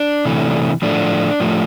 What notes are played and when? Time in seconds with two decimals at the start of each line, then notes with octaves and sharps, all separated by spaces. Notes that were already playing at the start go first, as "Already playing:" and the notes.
Already playing: D4
0.25 C3 E3 A3
0.82 A2 F3 A3 D4
1.40 A2 F3 A3